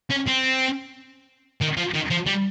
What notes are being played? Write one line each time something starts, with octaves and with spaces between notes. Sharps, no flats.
C#4
C4
D#3
F3
D#3
F3
G3